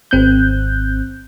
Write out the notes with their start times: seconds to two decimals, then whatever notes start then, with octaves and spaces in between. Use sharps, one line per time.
0.11 G#1 C4 F#6 G6